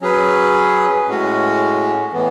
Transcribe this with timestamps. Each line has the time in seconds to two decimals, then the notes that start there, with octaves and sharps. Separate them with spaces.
0.01 F#3 C#4 G#4 B4
1.07 A2 G#3 C#4 F#4
2.13 A2 E3 B3